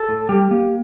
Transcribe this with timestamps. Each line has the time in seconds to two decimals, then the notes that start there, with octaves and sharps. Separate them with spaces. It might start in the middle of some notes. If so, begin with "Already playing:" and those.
Already playing: A4
0.09 A2
0.29 G3 G4
0.51 A#3